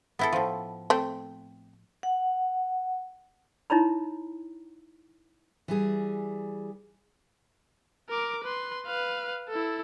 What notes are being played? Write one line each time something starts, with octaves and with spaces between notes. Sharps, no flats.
B3 E4 A4
A2 F3
A3 C4
F#5
D#4 E4 C#5 A#5 B5
E3 G3 G#4
A#4 D6
B4 C6
B4 F5
E4 A4